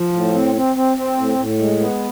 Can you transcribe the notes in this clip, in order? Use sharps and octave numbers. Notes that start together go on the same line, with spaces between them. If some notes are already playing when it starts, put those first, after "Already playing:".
Already playing: F3
A2
C4
C4
C4
C4
A2
A2
G#3
B3